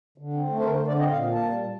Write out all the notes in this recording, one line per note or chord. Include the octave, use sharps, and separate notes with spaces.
D3
C4
A3
C5
D3 A#4
C5
D3
D5
C4 D#5
A#2 F5
A#3
A5
G3
A#2